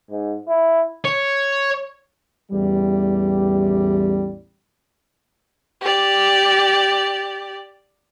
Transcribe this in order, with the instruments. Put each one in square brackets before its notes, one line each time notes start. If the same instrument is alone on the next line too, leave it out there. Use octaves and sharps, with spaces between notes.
[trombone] G#2
E4
[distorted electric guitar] C#5
[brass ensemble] A1 E2 G3
[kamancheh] G4 D5